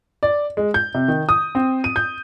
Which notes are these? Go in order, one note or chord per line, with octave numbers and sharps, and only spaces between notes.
D5
G#3
G6
C3
D#3
D#6
C4
D#7
G6